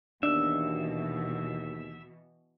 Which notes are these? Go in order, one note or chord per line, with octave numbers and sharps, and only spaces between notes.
D#2 B2 E3 D4 E5